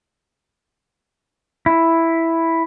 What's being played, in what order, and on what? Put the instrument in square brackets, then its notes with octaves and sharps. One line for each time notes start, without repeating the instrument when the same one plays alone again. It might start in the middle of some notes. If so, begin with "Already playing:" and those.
[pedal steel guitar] E4